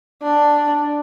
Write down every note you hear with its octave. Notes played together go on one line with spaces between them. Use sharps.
D4